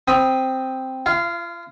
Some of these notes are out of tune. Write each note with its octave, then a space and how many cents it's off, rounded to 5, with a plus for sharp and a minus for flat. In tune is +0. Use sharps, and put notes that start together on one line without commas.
C4 +0 B5 +0 D#6 +0
F4 -40 F5 -10